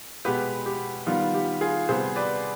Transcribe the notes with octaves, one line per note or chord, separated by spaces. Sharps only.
B2 G#3 B3 G4 B4
G4
D#3 G3 B3 F4
G4
F4 G#4
C3 G3 B3 G#4 C5
B4 D5